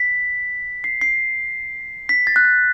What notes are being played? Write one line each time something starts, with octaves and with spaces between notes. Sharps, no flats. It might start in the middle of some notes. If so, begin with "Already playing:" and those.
Already playing: B6
C7
C7
B6
A6
F#6
A6